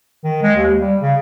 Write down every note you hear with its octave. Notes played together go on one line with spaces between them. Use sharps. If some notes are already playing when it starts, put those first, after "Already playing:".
D#3
G#3
D#2
G3
C#3